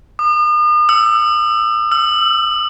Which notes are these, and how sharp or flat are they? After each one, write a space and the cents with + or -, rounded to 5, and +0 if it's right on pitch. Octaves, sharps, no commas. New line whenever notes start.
D#6 -40
E6 +10
E6 +40